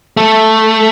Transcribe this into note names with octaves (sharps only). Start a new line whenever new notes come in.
A3